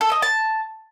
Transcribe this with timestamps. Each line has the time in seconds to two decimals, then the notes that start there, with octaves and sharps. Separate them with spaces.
0.01 A4
0.12 D#5
0.22 A5